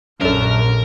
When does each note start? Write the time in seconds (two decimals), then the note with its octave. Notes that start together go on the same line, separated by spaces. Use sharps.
0.21 A#1 F#2 A#2 C#4 D4 A4 A#4